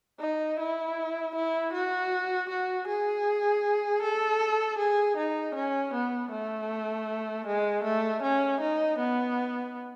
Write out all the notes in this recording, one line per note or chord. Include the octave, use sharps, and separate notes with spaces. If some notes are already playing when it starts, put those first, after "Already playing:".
D#4
E4
E4
F#4
F#4
G#4
A4
G#4
D#4
C#4
B3
A3
G#3
A3
C#4
D#4
B3